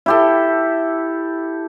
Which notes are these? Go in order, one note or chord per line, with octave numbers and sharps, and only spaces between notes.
E4 G4 A4